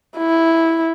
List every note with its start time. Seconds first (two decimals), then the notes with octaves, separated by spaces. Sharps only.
0.18 E4